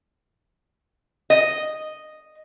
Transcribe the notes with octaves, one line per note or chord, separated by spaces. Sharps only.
D#5